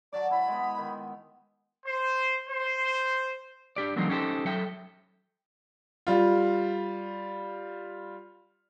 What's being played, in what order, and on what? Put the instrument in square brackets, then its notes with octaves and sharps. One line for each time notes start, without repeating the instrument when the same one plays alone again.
[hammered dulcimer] F#3 A5 D6 [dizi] D5
[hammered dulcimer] E4 [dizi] B5
[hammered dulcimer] G#3 B3
D#3
[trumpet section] C5
C5
[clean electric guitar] D4 G4 D5
E3 F#3 A3 A#3 C4 D#4
C#4 D#4 G4 A4 C5
F#3 A4 E5 G5
[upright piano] G3 F4